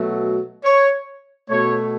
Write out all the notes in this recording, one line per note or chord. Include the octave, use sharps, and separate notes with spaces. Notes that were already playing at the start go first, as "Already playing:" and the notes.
Already playing: B2 F#3 A3
C#5
B2 A3 C#5